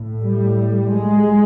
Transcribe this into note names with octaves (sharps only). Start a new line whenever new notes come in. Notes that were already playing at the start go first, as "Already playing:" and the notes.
Already playing: A2
G3
G#3